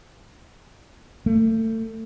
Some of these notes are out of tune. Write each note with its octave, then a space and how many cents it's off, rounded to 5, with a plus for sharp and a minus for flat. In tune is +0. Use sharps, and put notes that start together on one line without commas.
A3 +30